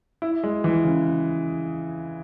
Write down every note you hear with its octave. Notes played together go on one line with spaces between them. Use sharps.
E4
G#3
E3
C#3